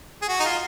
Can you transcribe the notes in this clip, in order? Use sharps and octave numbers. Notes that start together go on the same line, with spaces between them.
G#4
F#4
D#4
F4